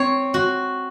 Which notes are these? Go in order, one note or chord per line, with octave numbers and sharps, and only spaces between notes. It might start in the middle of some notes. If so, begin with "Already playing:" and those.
Already playing: C4 C#5
F#4